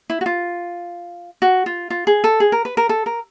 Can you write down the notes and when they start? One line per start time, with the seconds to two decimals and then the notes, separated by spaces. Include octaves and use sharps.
0.10 E4
0.21 F#4
0.26 F4
1.42 F#4
1.66 F4
1.90 F4
2.07 G#4
2.24 A4
2.40 G#4
2.52 A#4
2.65 B4
2.77 A#4
2.89 A4
3.06 A#4